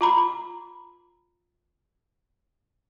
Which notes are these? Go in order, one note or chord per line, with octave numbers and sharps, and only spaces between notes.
F4 A#5 B5